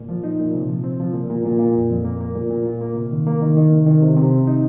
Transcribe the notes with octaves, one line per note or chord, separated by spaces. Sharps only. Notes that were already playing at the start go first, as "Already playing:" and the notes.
Already playing: A#2
F3
D#4
A#2
C3
F3
C4
F3
A#2
A#2
A#2
A#2
F2
F2
A#3
A#3
A#2
A#2
F4
A#3
C3
D#3
A#3
D#3
D#3
C3
D#3
C3
C3
C4
D#4